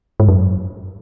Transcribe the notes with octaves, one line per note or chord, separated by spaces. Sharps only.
G#2
F#2